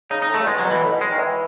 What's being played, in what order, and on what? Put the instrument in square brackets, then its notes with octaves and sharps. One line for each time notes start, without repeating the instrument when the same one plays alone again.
[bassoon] C#3 [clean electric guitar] D#4
[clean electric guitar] D#4
[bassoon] A2
[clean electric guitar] A3
[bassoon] C#3
[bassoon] B2 [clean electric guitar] G#3
[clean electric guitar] F#3
[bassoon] B2
[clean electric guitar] E3
[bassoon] A2
B2
[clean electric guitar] G#3
[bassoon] D#3
E3